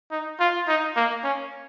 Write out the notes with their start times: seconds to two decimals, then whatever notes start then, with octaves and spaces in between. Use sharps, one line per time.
0.11 D#4
0.40 F4
0.68 D#4
0.96 A#3
1.24 C#4